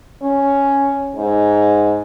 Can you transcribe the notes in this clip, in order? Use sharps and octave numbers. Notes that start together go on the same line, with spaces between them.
C#4
G#2